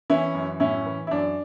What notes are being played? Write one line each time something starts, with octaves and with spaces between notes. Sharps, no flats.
E3 C#4 E4
F#2
A2 C#4 E4
E3
E4
F#2 D4